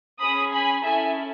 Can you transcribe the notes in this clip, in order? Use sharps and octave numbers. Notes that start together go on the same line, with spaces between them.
C#4 G#4 B5 D#6
G#5 B5
C#4 E4 A4 E5 G#5